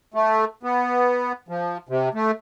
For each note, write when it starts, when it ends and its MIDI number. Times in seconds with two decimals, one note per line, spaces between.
0.14 0.45 57
0.63 1.32 59
1.49 1.78 53
1.89 2.09 48
2.14 2.31 57